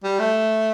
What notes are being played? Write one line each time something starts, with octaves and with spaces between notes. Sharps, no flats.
G3
A3